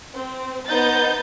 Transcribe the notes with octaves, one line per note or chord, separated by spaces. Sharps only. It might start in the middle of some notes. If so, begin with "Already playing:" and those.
C4
B3 D#4 C5 D#5 G6 A6